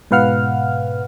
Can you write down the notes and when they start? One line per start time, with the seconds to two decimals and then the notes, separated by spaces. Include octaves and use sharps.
0.11 G#2 B2 B4 F5 F#5 F6